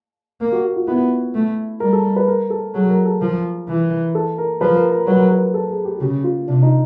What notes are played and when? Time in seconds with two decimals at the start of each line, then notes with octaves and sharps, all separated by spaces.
0.41 A#3
0.52 F#4
0.65 F#4
0.76 F4
0.88 B3 E4
1.35 A3
1.80 G3 A#4
1.93 A4
2.16 B4
2.28 A#4
2.50 A4
2.74 F#3 G#4
2.90 A#4
3.05 A4
3.20 F3 A#4
3.68 E3
4.15 A4
4.38 A#4
4.61 F3 B4
4.76 A#4
4.91 A#4
5.07 F#3 B4
5.19 A#4
5.31 B4
5.43 A#4
5.54 A4
5.70 G#4
5.85 G4
5.97 F#4
6.00 C#3 G4
6.24 F4
6.47 C3 D4
6.63 D#4